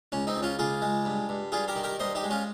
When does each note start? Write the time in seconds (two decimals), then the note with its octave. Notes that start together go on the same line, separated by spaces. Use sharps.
0.12 C#2 C#4
0.27 C4 D#4
0.36 C#2
0.42 C#4 F4
0.59 C#2 F4 G#4
0.82 G#3
1.05 G2
1.29 G2
1.52 G2 F4 G#4
1.68 G4 A#4
1.75 D#3
1.83 G4 A#4
1.99 G2 C5 D#5
2.15 D#4 G4
2.23 G#3
2.30 C#4 F4